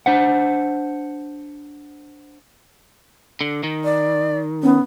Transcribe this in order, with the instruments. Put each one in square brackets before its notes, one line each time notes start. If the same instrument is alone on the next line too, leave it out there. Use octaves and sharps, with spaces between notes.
[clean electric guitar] D4 C5 F#5
[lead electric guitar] D3
D#3
[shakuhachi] D5
[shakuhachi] B3 [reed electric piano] C#4